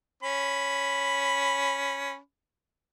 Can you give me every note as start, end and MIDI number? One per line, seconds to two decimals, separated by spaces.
0.23 2.17 61
0.23 2.17 83